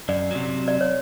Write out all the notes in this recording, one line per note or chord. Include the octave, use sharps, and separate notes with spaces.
F#2 D5
C3 F#3
D5
C#5